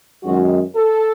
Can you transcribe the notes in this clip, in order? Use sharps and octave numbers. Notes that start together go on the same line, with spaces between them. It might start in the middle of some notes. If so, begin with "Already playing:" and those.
F#2 D#3 G#3 F#4
A4